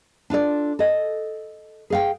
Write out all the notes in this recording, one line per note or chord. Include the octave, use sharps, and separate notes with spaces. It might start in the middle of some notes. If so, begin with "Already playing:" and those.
D4 F4 A4 D5
A4 D#5
G#4 F5 G5